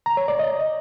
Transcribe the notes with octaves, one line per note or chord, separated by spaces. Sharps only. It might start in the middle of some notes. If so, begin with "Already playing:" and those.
A#5
C#5
D5
D#5